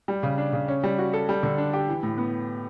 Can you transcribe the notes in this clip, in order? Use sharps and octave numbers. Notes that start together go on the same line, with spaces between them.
G3
C#3
D4
C#3
C#4
G3
F#4
A4
G3
D3
D4
G4
E3
A2
B3